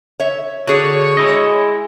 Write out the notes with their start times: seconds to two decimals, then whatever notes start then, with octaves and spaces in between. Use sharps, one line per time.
0.20 C#5 E5
0.67 D3 F#4 G#4 C#5
1.17 G#3 E4 D#5